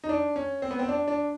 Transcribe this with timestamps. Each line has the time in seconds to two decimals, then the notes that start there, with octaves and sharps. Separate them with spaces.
0.04 D#4
0.09 D4
0.36 C#4
0.62 C4
0.71 B3
0.79 C4
0.88 D4
1.08 D4